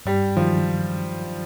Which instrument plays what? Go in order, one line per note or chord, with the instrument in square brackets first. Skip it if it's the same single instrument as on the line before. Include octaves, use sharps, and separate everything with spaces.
[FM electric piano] G2 [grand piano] G3
[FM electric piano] D#3 F#3 [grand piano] F3